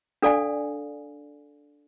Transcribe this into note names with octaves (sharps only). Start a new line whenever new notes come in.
D4 A4 D5 F5 G#5